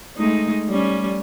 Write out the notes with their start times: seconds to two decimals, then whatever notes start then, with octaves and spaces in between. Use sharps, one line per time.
0.17 G#3 A3 D#4
0.69 G3 C#4